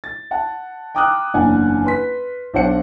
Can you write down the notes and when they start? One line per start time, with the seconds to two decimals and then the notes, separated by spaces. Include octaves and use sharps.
0.04 A6
0.31 F#5 A5
0.95 G5 A#5 D6 D#6 F6 F#6
1.34 F#1 E2 A#3 D4 F#5 G#5
1.84 B4 C6 B6
2.54 B1 D4 C5 F#5 C#7